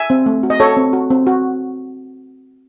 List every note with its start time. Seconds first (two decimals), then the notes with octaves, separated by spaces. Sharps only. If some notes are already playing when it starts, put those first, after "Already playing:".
Already playing: E5 G#5
0.10 C4
0.26 A3
0.43 F#4
0.50 D#5
0.60 F#4 A4 C#5
0.77 C4
0.93 F#4
1.10 C4
1.27 F#4